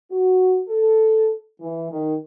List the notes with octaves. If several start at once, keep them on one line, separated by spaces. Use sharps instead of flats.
F#4
A4
E3
D#3